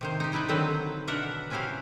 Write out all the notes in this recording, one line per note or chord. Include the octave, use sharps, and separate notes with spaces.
C3 D#3 C5
D#4 G4
D#4 E4 B4 D5 D#5
D3 D#3 F#3 C4 B4 C5
B2 D4 A#4 E5 F#5
C3 C#4 E4 F#4 G4 F5